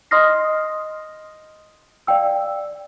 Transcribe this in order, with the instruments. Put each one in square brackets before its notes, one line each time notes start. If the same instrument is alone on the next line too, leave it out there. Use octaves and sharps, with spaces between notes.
[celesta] D#5 C6 D#6 F6 A#6 C7
D5 F5 G5 E6